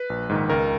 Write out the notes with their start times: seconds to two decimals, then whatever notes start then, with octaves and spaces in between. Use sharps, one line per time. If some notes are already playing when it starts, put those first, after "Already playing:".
Already playing: B4
0.10 A#1
0.29 G#2 D#3
0.49 C#2 A#4